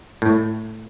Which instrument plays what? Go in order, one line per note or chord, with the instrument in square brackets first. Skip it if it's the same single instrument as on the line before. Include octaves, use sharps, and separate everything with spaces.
[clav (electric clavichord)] A2